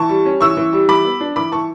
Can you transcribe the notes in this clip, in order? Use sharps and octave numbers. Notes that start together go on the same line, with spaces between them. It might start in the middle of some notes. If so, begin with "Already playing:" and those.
Already playing: E3 A5 C#6
G3
C#4
E3 C#6 E6
E3
G3
E3 B5 D6
B3
D4
E3 B5 D6
E3 A5 C#6